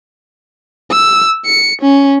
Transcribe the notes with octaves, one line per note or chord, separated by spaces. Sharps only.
E6
C#7
C#4